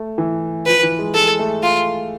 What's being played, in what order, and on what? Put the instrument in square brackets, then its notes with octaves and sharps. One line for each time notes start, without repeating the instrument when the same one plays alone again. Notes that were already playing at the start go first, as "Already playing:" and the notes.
Already playing: [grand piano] A3
E3
[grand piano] F3 [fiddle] B4
[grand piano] E3
G#3
[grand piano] G#3 [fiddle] A4
[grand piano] A3
[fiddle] F4